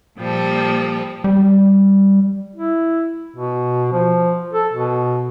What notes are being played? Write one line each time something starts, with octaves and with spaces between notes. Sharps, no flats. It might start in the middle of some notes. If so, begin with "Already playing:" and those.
A#2 F3 G3 A4
G3
E4
B2
F3
A4
B2